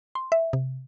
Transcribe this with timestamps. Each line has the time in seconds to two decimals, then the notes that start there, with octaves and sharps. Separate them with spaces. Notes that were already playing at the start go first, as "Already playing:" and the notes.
0.15 C6
0.32 E5
0.53 C3